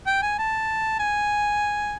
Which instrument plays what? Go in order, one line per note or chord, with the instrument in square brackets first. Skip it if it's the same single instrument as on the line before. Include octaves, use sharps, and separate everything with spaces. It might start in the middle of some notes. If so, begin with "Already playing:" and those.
[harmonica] G5
G#5
A5
G#5